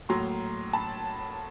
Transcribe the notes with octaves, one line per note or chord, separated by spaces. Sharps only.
A2 F#3 A#3 A#5 C6
A5 B5